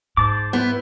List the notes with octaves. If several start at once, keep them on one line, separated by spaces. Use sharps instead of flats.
G#2 C5 A5 D6
B3 E4 C5